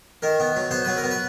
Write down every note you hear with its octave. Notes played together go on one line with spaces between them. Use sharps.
D#3 A#4
B3
F#3
B3 C5
F#3 B4
A#4
B3
B4